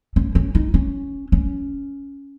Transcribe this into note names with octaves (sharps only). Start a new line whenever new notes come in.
C#4
C#4
D#4
C#4
C#4